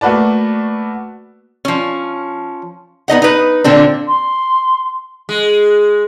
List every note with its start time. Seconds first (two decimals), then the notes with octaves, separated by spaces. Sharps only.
0.01 A3 A#3 F#4 B4 D5 A5
1.65 F3 C#4
3.08 B3 D#4 D#5 F#5
3.22 D#4 B4
3.64 A#2 D3 C4 D4
4.08 C6
5.29 G#3